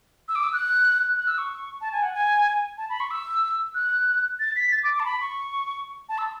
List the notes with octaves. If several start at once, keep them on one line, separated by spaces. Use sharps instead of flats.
E6
D6
E6
F#6
F#6
E6
C#6
A5
G#5
F#5
G#5
A5
B5
C#6
E6
F#6
A6
B6
A6
D6
D6
A5
B5
C#6
A5
E6